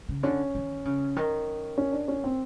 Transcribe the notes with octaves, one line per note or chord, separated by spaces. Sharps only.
C#3
D3 C#4
D#3
C#3
D#3
C#4
D4
C#4
C4